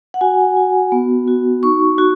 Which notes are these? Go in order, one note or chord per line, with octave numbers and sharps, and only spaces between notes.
F#5
F#4 G#5
F#4
B3
F#4
D#4 C#6
F#4